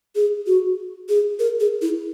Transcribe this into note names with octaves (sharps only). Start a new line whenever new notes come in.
G#4
F#4
G#4
A#4
G#4
E4